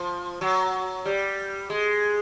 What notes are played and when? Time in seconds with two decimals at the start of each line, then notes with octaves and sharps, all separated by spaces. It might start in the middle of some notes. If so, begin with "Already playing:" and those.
Already playing: F3
0.41 F#3
1.05 G3
1.70 G#3